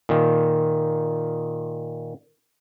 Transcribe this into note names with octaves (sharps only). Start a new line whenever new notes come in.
A#2 D#3